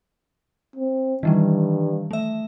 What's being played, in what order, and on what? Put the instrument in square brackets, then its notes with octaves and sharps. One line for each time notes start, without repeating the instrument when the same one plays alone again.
[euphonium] C4
[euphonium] G2 [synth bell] D#3 E3 G3
[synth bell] A3 E5